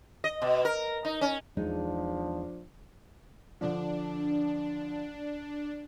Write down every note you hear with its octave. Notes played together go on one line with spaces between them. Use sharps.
D#5
B2
A#4
D#4
C#4
E2 F3 G#3 D4 D#4
D3 F3 D4